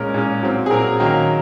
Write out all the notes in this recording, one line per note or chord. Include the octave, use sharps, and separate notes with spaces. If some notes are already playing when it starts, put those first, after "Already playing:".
Already playing: A#2 G#3 C#4 A#4
A#2 G#3 C#4
A#2 F#3 C4
G#4
A#2 F#3 C4 A#4
D#3 F#3 A#3 C#4